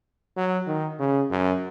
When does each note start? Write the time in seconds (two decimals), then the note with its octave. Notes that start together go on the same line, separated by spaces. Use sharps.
0.36 F#3
0.67 D#3
0.99 C#3
1.30 F#2